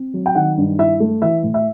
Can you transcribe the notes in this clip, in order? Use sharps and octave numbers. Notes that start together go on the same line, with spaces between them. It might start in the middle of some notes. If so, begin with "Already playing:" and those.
Already playing: C4
F#3
G5
D#3 F#5
G2
E4 E5
A3
E3 E5
A2
E5